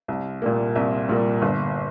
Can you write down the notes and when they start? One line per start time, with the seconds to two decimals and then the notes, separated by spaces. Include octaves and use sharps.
0.08 C2
0.42 A#2 G3 A#3
0.76 C2 E5
1.09 A#2 G3 A#3
1.42 G1